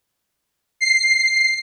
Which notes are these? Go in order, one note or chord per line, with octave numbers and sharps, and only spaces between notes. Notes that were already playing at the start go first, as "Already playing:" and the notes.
C7